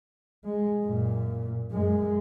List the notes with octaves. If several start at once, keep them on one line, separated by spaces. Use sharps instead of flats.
G#3
F#2 A#2
F#2 G#3